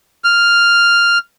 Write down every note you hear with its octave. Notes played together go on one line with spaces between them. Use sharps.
F6